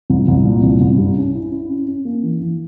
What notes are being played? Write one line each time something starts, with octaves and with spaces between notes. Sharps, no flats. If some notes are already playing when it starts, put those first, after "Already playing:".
C2
C2
A#2
C2
C2
G2
C#4
E4
E4
C#4
C#4
A#3
E3
E3